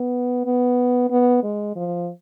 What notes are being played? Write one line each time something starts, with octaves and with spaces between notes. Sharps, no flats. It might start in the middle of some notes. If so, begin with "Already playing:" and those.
Already playing: B3
B3
B3
G#3
F3